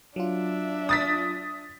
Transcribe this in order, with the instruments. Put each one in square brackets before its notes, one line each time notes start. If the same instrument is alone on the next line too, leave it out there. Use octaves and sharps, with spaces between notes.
[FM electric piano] F#3 F4 [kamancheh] D4 E5
[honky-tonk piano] D#6 A6 B6